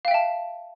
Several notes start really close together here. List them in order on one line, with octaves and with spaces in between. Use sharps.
F5 G5 E5 A5